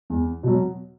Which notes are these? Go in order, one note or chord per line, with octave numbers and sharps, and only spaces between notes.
E2
B2 F#3